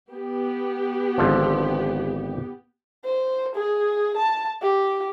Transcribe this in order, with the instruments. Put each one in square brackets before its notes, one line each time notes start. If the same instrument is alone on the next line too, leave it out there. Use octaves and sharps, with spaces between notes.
[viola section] B3 G4
[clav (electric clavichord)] G#1 D3 F3
[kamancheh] C5
G#4
A5
G4